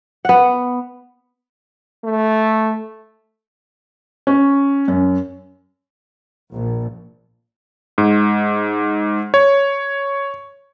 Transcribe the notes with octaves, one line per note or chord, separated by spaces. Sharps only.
B3 F#5
A3
C#4
F#2
A#1
G#2
C#5